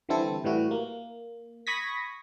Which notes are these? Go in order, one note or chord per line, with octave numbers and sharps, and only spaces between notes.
D3 E3 G3 C4 E4 A4
A2 E3 G3 E4 F#4
A#3
B5 C#6 D#6 G#6 A#6 B6